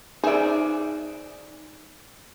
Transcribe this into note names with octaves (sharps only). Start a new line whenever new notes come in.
D#4 G#4 C5 D5 E5